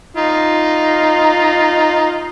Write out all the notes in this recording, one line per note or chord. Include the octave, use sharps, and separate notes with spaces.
D#4 F4